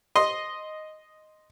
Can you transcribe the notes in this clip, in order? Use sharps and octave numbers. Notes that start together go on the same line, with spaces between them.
D#5 C6